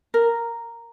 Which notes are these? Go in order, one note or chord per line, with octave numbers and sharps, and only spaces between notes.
A#4